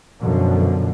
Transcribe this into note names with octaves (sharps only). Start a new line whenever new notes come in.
F#2 B2 D3 F3